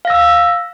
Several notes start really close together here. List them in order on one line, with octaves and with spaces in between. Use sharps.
F5 A#6 E6